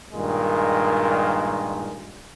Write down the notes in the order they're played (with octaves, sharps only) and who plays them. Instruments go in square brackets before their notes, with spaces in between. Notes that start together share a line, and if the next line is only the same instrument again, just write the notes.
[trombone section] G2 A#2 D#3 G#3